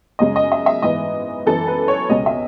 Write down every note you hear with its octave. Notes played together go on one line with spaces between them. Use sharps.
F#2 C#3 G#3 C#4 D#5
D#5
E5
E5
G#2 E3 B3 D#5
F#2 E3 B3 A4
B4
C#5
C#2 B2 G#3 C#4 D#5
E5